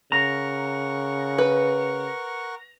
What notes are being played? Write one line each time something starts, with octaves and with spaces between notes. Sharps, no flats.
C#3 A#4 F#5 A#5 C#6
B4